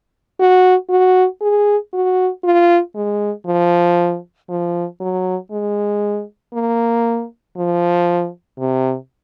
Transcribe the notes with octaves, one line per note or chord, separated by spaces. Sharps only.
F#4
F#4
G#4
F#4
F4
G#3
F3
F3
F#3
G#3
A#3
F3
C3